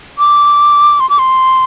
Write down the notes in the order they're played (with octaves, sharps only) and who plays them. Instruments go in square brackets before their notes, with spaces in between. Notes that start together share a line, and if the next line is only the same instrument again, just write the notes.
[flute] D6
C6
D6
C6